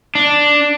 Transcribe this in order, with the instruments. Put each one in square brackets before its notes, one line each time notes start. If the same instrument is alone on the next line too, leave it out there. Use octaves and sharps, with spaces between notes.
[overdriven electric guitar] D4